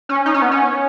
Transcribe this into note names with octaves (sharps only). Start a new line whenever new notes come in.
C#4
D#4
C#4
B3
C#4